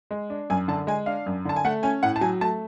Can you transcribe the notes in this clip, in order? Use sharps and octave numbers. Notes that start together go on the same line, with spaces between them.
G#3
D4
F#2 G#5
D3 A5
G#3 G#5
D4 F5
F#2
D3 A5
G#5
A3 F#5
C#4 G#5
A2 F#5
A5
F#3 G#5
A3 A5